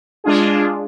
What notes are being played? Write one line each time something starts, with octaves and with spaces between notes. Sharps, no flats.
G#3 D4 F4 G#4